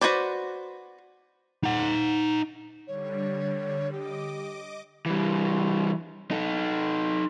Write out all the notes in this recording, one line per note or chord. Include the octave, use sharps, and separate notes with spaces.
F#4 G#4 B4 C5 D5
D#4 F#5
D3 G3 C#5
G4 D#5 D6
E3 G3
D#4 A4